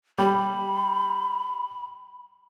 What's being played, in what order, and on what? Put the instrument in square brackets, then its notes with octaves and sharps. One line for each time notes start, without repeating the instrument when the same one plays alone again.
[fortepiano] G3 [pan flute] B5